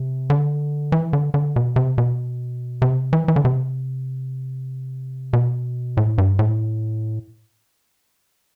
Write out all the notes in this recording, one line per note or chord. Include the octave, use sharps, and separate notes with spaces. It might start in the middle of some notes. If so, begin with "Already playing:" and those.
Already playing: C3
D3
E3
D3
D3
B2
C3
B2
C3
E3
E3
D3
C3
B2
A2
G2
A2